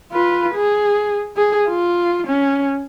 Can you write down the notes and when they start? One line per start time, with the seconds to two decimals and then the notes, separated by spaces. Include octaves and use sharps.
0.12 F4 B4
0.55 G#4
1.36 G#4
1.68 F4
2.27 C#4